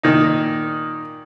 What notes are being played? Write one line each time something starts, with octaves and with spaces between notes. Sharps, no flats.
A#2 D#3 D#4